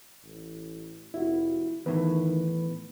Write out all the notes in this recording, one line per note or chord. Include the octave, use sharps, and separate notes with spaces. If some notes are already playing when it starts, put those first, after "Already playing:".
A1
F1 E4 F#4
E2 A2 D#3 B4